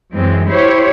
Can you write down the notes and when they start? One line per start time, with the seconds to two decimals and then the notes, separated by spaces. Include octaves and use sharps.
0.12 F#2 E3 G#3 C4
0.49 E4 G4 C5 C#5